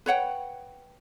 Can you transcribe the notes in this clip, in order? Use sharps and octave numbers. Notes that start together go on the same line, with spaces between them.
B4 C#5 F#5 G5